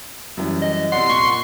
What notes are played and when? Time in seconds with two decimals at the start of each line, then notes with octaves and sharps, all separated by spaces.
0.37 F#2 E3 G3
0.62 D#5
0.92 C3 D5 F#5 C6
1.09 A#2 C#6